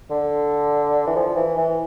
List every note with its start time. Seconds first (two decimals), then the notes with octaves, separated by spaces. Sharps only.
0.10 D3
1.07 E3
1.16 F3
1.36 E3
1.57 E3